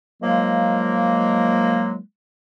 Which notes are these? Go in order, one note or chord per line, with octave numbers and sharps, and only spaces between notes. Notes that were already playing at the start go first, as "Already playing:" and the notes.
D#3 F3 F#3 G#3 A#3